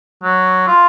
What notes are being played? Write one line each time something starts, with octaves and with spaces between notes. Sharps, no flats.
F#3
F4